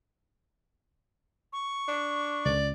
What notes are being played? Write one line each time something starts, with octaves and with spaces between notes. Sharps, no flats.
C#6
D4
C#2 D5